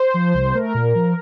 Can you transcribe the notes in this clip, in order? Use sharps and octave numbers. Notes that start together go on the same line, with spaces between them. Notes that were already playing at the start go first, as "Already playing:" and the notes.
Already playing: C5
F3
C2
A3 A#4
A#2
F3